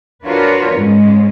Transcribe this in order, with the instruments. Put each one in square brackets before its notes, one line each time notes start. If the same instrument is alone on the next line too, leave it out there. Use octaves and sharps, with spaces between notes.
[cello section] D4 F4 F#4 A#4 B4 C#5
G#2 G#3 C#4